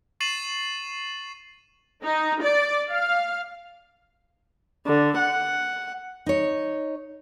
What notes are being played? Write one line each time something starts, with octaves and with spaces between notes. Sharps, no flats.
C#6 A6 C7 D#7 E7 F#7
D#4
D5
F5
D3
F#5
D#4 C#5